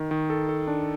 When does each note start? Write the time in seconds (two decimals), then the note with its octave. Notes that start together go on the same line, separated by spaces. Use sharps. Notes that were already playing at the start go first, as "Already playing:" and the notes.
Already playing: D#3
0.11 D#3
0.30 A4
0.49 A4
0.67 D4